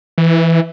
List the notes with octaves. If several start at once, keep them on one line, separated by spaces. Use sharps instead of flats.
E3